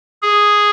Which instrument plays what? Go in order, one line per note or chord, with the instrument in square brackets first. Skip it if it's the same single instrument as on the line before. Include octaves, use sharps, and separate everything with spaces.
[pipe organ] G#4